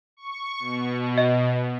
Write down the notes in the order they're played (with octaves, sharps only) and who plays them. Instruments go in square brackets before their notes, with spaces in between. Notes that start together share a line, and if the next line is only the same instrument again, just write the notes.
[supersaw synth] C#6
B2
[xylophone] D#5